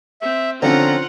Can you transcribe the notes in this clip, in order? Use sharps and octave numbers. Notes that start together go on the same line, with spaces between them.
C4 E5
D3 F3 C4 C#4 F4 F#5 A#5